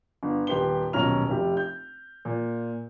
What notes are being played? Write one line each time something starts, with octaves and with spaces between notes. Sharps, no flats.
G1
D#1 G4 B4 C6 G7
D#1 B1 C#4 A#5 F6 F7
F1 G4
G6
A#2